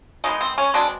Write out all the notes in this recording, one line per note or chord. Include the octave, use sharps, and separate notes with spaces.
D#3 G#3 B3 C#4 D#4
C4
C#4
B2 G#3 B3 C4 D4